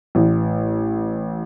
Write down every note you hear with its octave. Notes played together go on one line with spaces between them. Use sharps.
A1